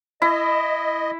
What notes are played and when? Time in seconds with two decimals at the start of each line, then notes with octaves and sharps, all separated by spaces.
0.22 E4 D#5